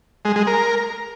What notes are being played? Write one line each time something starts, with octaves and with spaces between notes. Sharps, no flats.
G#3
G#3
A#4